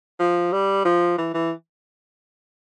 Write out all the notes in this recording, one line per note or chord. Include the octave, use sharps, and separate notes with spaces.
F3
G3
F3
E3
E3